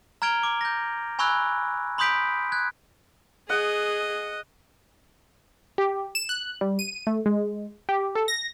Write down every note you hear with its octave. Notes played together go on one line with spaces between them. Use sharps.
A#5 F6 G#6 D7 F7 G7
D6
G6 A#6
G#5 B5 C#6 E6 F#6 G#6
B5 C6 D#6 G6 B6 D7
F#6 G#6
G#4 D#5 F#5
G4
E7
F#6
G3
D#7
A3
G#3
G4
A4
A#6